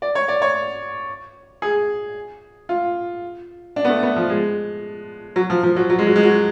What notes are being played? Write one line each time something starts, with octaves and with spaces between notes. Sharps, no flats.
D5
C#5
D5
C#5
G#4
F4
D4
B3
A3
B3
F3
G#3
F#3
F3
F3
F#3
F#3
G#3
F#3
G#3
F#3